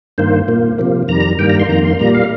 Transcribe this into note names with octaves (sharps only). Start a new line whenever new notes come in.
G2 D#3 A#3 C5
A#2 A#3
C3 F3 A#3
F2 D#3 G3 A#5
G2 D#3 G3 A#3 G5
A#5
C6
F2 D#3 A#3 A#5
C6
A#2 G3 A#3 A#5
F5